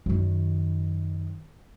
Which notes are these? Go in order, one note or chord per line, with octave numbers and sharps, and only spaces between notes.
F#2 D#3